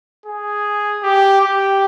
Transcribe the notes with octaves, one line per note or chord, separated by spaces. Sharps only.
G#4
G4
G4